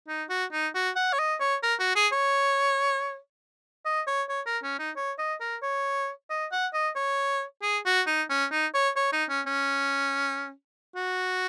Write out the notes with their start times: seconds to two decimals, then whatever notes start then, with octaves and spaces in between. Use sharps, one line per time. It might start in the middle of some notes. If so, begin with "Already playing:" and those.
0.08 D#4
0.29 F#4
0.52 D#4
0.75 F#4
0.96 F#5
1.13 C#5
1.19 D#5
1.40 C#5
1.63 A#4
1.80 F#4
1.96 G#4
2.12 C#5
3.85 D#5
4.07 C#5
4.29 C#5
4.46 A#4
4.63 C#4
4.79 D#4
4.96 C#5
5.19 D#5
5.40 A#4
5.63 C#5
6.30 D#5
6.52 F#5
6.74 D#5
6.96 C#5
7.62 G#4
7.86 F#4
8.07 D#4
8.30 C#4
8.51 D#4
8.74 C#5
8.96 C#5
9.13 D#4
9.30 C#4
9.47 C#4
10.96 F#4